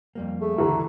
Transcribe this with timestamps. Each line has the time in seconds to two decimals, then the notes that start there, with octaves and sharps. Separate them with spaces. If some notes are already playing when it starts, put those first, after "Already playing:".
0.15 F2 G3 A#3
0.41 A3 G#4
0.58 C#2 D3 E3 F#4 A#5